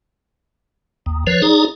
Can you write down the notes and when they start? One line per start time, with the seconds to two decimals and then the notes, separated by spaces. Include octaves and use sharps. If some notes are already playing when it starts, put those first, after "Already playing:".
1.06 D#2
1.27 F3 B4 C#5
1.42 D#4 G#4 D5 A#5